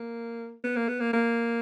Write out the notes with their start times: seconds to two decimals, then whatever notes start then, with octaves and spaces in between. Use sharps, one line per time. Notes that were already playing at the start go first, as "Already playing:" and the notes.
Already playing: A#3
0.64 B3
0.76 A#3
0.88 B3
1.00 A#3
1.13 A#3